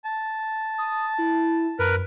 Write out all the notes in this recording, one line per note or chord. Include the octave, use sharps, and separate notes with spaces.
A5
D#6
E4
F#2 A#4 B4